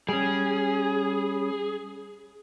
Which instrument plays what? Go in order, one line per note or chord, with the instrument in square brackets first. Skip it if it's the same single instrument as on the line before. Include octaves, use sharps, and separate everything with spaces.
[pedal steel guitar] G3 C#4 [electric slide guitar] G#4